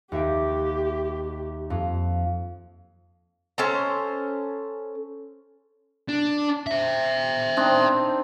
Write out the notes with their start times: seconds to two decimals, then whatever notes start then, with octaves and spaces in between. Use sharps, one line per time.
0.12 D#2 G4 E5 G5
1.70 F2
3.58 C#4 A4 C5 A#5
6.08 D4
6.67 C5 E5
7.57 C4 D4 D#4